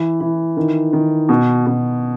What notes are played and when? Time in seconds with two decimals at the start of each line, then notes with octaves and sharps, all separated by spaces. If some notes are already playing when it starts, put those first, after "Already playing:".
Already playing: E3
0.20 E3
0.57 D#3
0.93 D#3
1.29 B2
1.66 B2